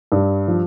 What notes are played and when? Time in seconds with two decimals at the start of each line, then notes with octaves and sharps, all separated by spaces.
0.12 G2
0.48 F3